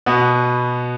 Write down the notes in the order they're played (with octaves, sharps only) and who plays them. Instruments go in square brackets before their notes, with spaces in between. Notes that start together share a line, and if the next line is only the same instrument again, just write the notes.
[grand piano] B2 B3